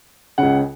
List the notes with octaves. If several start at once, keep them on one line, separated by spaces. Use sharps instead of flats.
C#2 C#3 F#5